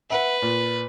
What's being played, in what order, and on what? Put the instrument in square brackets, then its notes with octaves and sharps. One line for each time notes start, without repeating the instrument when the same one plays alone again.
[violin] B4 [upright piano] E5 F#5
[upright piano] A#2